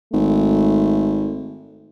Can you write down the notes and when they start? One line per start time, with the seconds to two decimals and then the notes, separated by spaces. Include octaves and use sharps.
0.13 G#1 A3